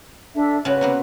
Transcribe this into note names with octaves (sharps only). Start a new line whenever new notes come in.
D4 A4 E5
C#3 F#4 B4
C3 A#3 B3